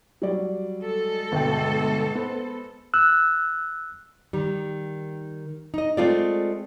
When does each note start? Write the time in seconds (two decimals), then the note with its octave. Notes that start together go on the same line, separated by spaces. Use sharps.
0.22 F#3 G3 D5
0.84 G#3 A4
1.32 G1 B2 G5
2.15 B3 C5
2.94 E6 F#6
4.33 D#3 G3
5.74 D#4 D#5
5.97 G#3 A3 C4 F4 G#4 D5